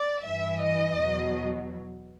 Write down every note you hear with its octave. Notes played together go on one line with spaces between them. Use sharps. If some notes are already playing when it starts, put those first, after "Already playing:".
Already playing: D5
G2 E3 E5
D#5
E2 B2 F#3